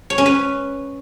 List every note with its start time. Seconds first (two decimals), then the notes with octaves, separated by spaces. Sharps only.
0.10 C#5
0.18 C#4
0.26 B4